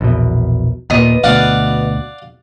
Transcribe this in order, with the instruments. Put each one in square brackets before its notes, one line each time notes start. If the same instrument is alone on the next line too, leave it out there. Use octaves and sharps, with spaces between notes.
[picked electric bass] A#1 E2 B2
[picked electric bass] D#2 A#2 [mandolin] B3 D#5
[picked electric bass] D2 B2 [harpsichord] D5 F5 F#5